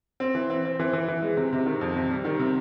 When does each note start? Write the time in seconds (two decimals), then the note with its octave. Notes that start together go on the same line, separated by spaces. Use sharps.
0.20 C4
0.35 E3
0.50 C4
0.65 C4
0.80 E3
0.93 E3
1.08 E3
1.22 G#3
1.37 C3
1.53 C3
1.66 D#3
1.81 F2
1.96 C3
2.11 G3
2.25 D#3
2.40 C3